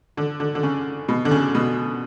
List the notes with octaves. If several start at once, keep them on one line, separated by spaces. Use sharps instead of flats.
D3
D3
D3
C#3
B2
D3
C#3
B2